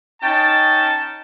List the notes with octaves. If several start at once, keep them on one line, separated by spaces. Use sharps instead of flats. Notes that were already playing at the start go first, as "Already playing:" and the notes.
C#4 D#4 G5 A5